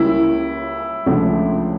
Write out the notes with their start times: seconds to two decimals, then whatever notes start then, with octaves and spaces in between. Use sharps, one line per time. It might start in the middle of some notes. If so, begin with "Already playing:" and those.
Already playing: C#2 C#3 G3 A#3 C#4 E4
1.06 C#2 C#3 F3 A3 D4